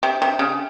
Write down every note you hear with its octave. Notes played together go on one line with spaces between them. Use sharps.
C3
C3
C#3